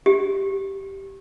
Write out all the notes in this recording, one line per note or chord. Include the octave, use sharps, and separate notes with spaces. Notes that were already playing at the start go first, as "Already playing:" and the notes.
G4